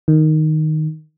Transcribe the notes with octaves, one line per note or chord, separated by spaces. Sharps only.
D#3